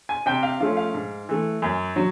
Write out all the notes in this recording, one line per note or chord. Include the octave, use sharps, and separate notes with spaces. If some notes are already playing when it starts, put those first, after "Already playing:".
G#5
C3 G5
F5
F3 A3 C#4 F5
F5
G#2
E3 A3
F#2
F#3